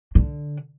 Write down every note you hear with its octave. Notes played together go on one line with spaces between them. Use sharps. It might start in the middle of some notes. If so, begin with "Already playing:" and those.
D3